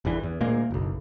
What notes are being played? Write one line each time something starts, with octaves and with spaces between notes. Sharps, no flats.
G1 E2 D3 E3
E2
D2 A#2 G#3 A#3
F#1 B1